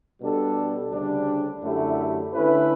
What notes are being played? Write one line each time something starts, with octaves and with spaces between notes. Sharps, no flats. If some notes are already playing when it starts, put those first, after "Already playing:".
B2 G3 D4 A4
D2 C#3 G3 D4
F#2 D3 A3 E4 G4
D3 A3 C#4 E4 B4